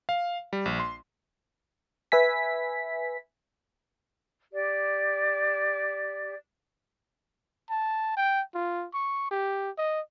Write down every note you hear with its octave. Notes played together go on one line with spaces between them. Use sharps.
F5
G3
A#1
C6
B4 E5 G#5 B6
G4 D5
A5
G5
F4
C#6
G4
D#5